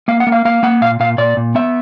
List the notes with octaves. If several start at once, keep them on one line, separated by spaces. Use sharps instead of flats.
A#3 F5
F#5
A#3
F5
A#3 F5
A#3 F#5
A#2 F5
A#2 F5
A#2 D5
A#2
B3 E5